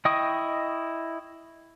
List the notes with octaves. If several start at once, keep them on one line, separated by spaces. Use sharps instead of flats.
E4 D#5 G5 C#6 D#6